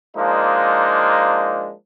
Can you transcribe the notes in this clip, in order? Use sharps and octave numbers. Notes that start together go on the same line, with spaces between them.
F3 G#3 A#3 D4 D#4